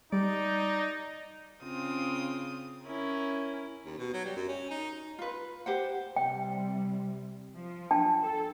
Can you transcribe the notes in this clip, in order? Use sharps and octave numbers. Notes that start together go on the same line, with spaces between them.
G3 D#4 D5
C#3 C4 F4 D#6
C#4 E4 A#4
D#2
B2
F#3
G3
F#2
C#4
D#4
F4 B4
G4 C5 F#5
C3 G3 G5
F3
D4 G5 A5
A4